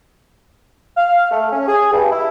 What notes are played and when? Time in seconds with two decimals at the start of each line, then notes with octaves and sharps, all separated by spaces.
0.97 F5
1.31 A3
1.52 C#4
1.68 G#4
1.92 G2
2.12 E4